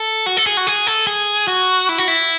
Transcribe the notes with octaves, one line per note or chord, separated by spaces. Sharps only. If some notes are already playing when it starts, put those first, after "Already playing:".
Already playing: A4
F#4
A4
G#4
F#4
G#4
A4
G#4
F#4
E4
F#4
E4